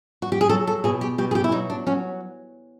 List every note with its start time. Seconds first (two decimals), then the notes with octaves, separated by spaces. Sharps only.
0.22 F#4
0.32 G4
0.41 G#4
0.49 F#3 A4
0.67 A4
0.84 B2 G#4
1.01 G4
1.18 B2 G4
1.31 G#4
1.35 G4
1.44 E4
1.52 F#3 D#4
1.70 D4
1.87 F#3 C#4